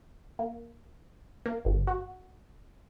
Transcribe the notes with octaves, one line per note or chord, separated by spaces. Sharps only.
A#3
A#3
G1
F#4